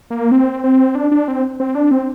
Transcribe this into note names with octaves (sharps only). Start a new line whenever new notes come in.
A#3
C4
C4
D4
D4
C4
C4
D4
C4